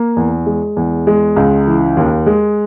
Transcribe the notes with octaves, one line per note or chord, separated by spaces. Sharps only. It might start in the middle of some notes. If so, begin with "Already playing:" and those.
Already playing: A#3
E2
G#3
E2
G#3
C#2
E3
D#2
G#3